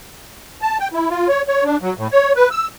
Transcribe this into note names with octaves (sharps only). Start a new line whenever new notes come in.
A5
G5
E4
F4
C#5
C#5
D4
F#3
A2
C#5
B4
E6